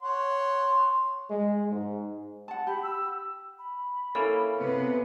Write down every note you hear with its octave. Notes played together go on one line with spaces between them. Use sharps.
C#5 F#5 C6
G#3
G#2
F#5 A5
G4 B5
E6
B5
A#3 C#4 E4 A4
C3 B3 B4